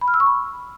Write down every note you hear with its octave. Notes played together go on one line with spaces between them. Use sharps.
B5
F6
E6
C#6
B5